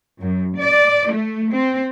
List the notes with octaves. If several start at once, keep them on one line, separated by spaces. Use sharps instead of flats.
F#2
D5
A3
C4